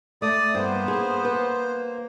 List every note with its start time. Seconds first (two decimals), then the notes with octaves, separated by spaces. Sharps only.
0.22 A3 D5 D#6
0.55 G2 A#3 B3 C5
0.88 G#4
1.25 B4